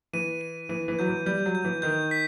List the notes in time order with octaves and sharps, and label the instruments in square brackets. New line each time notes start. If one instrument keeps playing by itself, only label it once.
[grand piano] E3 [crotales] D#7
[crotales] D#7
[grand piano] E3 [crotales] D#7
[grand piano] E3
[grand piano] F#3 [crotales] G6
[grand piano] E3
[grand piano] G3 [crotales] G6
[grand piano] F#3
[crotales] G6
[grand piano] E3
[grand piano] D#3 [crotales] G6
[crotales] B6